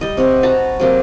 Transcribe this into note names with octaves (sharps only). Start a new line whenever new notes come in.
G3 D#5
C3 C#5 F#5
F#4 B4 A5 A#5
C3 F#3 A#3